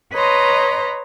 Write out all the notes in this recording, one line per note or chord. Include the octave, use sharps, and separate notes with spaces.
B4 C#5 D#5 A#5 C6